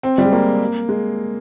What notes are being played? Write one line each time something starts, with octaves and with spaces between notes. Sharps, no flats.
C4
G3
G#3
A#3
G#3